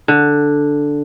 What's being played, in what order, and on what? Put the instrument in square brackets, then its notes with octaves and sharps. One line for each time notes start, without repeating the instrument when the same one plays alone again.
[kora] D3